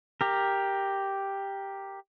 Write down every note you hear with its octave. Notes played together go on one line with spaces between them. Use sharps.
G4 A#4